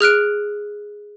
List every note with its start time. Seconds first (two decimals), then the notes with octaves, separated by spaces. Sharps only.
0.01 G#4 F6 F#6 D7